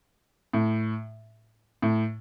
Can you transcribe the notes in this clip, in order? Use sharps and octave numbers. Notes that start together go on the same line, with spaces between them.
A2
A2